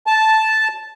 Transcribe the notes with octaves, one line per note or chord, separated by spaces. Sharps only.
A5